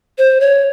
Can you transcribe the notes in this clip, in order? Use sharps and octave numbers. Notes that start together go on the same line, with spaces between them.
C5
C#5